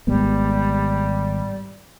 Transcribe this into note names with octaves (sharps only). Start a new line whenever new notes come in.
G#1 G3 G#3 B3